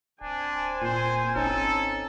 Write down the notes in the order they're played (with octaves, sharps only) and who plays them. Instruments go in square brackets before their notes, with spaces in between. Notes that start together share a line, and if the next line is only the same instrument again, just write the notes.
[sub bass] D1 [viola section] C4 G#5 [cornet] D4
[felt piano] A#2 [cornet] C5
[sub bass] G#1 [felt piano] C#4 D#4 [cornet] A4